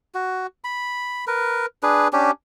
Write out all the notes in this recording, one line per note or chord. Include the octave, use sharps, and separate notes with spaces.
F#4
B5
A#4 B4
D4 G#4 B4
C#4 D4 G4